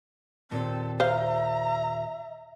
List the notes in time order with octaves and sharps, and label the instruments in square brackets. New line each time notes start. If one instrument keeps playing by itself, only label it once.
[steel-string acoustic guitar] D#2 A#2 [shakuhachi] C4 [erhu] A4
[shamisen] C5 F5 [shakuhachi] E5 [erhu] A#5